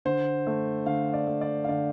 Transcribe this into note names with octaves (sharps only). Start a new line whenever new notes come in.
D3 C5
A3
D3 F5
D5
A3
D5
F5
D3 D5